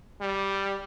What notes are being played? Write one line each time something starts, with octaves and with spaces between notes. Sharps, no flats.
G3